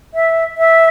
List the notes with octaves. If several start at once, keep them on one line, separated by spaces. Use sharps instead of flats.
E5
E5